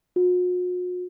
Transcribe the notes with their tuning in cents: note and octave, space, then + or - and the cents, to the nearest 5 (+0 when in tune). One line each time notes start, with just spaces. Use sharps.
F#4 -45